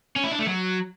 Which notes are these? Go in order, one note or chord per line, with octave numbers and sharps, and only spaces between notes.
C#4
E4
D4
A3
F#3